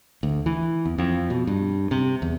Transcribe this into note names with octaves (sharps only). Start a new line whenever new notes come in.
D2
E3
E2
F2
B2
G2
C3
E2